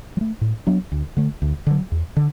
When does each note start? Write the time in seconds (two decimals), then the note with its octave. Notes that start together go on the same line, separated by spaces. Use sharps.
0.17 F#3
0.21 A3
0.41 A2
0.67 F#3 B3 D4
0.92 D2
1.17 D3 A3
1.42 D2
1.67 D3 F#3
1.92 E2
2.17 D3